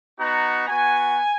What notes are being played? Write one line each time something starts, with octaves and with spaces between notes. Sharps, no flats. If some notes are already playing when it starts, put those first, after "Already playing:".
B3 D#4 F#4 A#5
B3 F#4 G#5